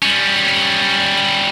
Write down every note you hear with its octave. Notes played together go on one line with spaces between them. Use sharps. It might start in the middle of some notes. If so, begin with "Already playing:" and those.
G3 C#4